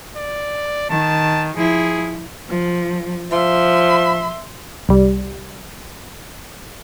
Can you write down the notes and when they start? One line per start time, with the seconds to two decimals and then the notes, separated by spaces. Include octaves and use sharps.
0.16 D5
0.90 D#3 A5
1.57 F3 E4 G#4
2.49 F3
3.32 F3 E5 C6
4.89 C2 G3